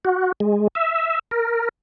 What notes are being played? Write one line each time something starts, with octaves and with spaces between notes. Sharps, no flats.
F#4
G#3
E5
A#4